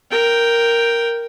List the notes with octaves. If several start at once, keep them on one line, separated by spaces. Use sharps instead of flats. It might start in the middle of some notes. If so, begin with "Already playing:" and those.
A#4 G5